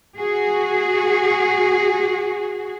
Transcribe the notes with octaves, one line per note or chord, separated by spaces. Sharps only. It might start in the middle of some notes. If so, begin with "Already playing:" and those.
F#4 G#4